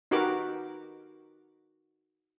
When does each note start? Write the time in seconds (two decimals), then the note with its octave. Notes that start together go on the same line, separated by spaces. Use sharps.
0.11 D#4 F#4 G4 A#4 B4 D6